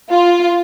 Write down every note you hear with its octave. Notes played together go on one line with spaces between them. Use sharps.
F4